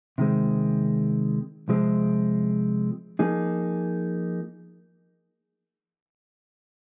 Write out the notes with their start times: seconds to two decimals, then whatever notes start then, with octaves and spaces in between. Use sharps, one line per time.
0.18 C3 D#3 G#3 C4
1.69 C3 F3 G#3 C4
3.19 F3 A#3 D#4 G#4